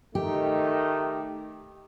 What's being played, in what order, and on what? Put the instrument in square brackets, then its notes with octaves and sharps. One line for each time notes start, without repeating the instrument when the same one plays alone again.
[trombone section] D#3 A3 D#4 [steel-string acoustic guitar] G4